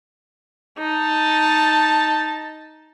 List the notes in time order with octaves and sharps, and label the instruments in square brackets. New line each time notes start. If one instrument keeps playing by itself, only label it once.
[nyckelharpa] D#4 [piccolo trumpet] A5